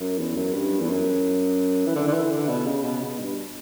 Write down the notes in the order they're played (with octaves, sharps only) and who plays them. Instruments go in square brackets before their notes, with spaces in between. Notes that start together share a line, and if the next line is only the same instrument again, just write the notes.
[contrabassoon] F#2
E2
F#2
G2
E2
F#2
E3
D3
D3
E3
D3
B2
C#3
B2
B2
G2